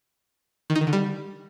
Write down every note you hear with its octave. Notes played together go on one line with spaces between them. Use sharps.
D#3
D#4
D#3
D3
G3